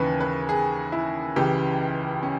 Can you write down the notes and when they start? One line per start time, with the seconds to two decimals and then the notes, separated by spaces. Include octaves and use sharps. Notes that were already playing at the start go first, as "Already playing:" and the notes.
Already playing: D#2 C#3 E3 G#4 B4
0.20 B4
0.49 G#4
0.92 E4
1.36 C#2 C#3 E3 G4
2.23 C#4